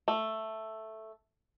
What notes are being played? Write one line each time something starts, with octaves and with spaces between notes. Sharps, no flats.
A3